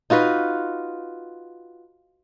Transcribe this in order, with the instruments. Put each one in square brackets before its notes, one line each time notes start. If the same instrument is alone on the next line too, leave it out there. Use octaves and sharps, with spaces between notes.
[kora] D#4 F4 F#4 B4